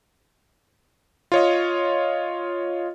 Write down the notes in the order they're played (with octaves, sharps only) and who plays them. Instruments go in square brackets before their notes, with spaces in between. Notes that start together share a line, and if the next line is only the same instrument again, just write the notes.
[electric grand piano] F4 C#5 D#5